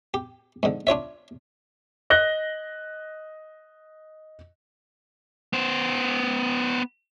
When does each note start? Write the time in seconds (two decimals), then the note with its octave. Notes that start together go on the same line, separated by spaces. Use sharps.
0.14 G4
0.63 G#2 D3
0.87 D4 F4 C#5 E5
2.10 D#5 F#6 A#6 G7
5.53 B3 C5